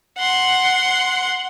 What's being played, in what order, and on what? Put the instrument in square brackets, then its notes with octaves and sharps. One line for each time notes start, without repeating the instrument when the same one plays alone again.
[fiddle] F#5 C6